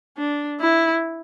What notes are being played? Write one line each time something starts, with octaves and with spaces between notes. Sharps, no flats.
D4
E4